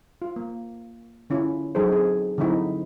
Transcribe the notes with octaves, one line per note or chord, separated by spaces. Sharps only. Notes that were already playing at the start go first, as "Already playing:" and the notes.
F4
A#3
D3 C#4 E4 F4
F#3 D#4 G#4 A4 C5
C4 G#4
D3 F#3 C4 D#4 E4